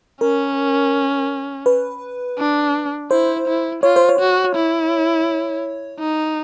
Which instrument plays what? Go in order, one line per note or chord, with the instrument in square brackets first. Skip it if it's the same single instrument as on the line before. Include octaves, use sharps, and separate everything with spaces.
[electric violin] C#4 [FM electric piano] A#4
[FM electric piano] B4
[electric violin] D4
[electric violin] E4 [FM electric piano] C5
[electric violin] E4
[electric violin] F4 [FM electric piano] C#5
[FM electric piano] C5
C#5
[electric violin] F#4
E4
D#4